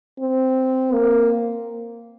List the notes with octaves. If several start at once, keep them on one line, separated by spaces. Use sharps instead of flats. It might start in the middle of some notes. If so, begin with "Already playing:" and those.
C4
A#3